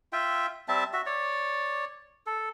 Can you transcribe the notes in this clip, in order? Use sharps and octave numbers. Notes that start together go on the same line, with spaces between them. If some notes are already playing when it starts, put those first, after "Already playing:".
F4 E5 G5
G3 C4 E5 A5
F#4 E5
C#5 D5
A4